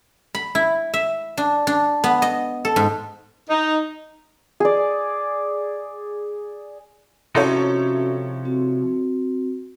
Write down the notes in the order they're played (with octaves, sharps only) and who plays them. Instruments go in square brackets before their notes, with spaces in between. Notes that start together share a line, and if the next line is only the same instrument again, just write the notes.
[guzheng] B5
E4
E5
D4
D4
B3
D#5
A4
G#2
[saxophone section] D#4
[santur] G#4 D5
[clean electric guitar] C3 F3 D#4 [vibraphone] C#4 F#4 [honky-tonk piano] E4 A4 C#5
[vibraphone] C4 F#4